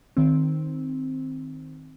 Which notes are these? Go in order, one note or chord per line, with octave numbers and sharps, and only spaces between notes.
D#3 C4